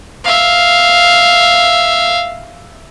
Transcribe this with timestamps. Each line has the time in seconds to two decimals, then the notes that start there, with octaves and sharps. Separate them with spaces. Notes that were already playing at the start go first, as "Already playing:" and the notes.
0.24 E5 F5